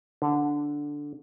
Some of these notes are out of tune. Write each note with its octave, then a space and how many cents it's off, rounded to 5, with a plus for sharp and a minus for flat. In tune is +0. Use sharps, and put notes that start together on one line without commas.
D3 -5